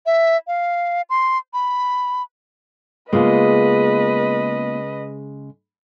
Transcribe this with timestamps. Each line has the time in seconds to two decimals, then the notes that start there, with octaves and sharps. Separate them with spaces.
0.06 E5
0.47 F5
1.10 C6
1.53 B5
3.13 C#3 G#3 A#3 B3 F4 B4 D#5